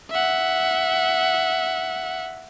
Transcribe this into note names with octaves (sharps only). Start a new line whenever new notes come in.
E5 F#5